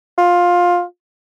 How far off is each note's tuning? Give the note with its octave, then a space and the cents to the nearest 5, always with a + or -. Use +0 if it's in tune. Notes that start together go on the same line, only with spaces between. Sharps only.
F4 +15